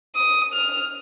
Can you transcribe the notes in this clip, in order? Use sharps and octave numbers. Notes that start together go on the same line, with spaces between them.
D#6
F6